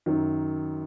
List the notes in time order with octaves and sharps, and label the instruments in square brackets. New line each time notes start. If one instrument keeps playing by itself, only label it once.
[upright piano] F#2 D#3 F#3